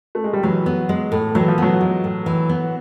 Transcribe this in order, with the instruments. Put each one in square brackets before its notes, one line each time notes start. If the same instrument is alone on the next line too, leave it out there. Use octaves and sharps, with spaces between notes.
[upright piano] A3
G#3
G3
[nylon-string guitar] E3 [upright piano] F#3
[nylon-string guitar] B3
G#3
A2
[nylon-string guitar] E3 [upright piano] F#3
[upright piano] F3
[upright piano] F#3 [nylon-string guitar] B3
[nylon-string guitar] G#3
A2
E3
B3